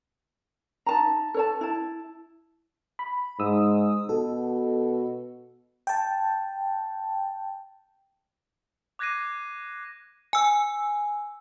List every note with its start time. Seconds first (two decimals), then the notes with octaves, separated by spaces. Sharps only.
0.86 D#4 A5 A#5
1.34 A4 C#5 A5
1.61 E4 A5
2.99 B5
3.40 G#2 D#6 E6
4.09 B2 F#4 A4
5.87 G5 A5
8.99 D6 F#6 G#6 A#6 C7 D#7
10.33 G#5 E6